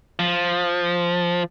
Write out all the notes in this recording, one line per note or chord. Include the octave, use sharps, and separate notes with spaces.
F3